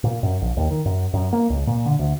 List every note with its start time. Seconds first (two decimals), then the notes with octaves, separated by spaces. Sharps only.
0.04 A#2
0.23 F#2
0.41 A#1
0.57 D#2
0.71 D#3
0.86 F#2
1.14 F#2
1.33 A#3
1.50 C#2
1.67 A#2
1.86 D3
1.99 D2